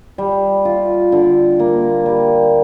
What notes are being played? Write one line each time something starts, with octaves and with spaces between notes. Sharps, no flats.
G3
F4
D3
A#3
G3